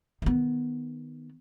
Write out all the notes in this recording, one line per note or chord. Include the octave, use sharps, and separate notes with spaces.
D#3 B3